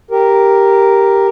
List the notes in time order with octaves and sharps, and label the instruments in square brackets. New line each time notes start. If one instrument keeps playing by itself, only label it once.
[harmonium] G4 A#4